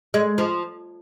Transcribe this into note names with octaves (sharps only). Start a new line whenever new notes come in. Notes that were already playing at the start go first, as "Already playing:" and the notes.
G#3
F3